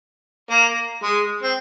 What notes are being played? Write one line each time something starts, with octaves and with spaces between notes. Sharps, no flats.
A#3
G#3
C4